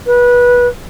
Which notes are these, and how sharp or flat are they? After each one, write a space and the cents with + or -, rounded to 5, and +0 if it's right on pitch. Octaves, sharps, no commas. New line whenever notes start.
B4 -20